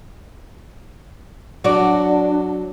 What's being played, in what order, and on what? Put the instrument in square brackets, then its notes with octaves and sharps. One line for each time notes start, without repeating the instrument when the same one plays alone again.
[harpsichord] F#3 [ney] D4 [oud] F#4 D5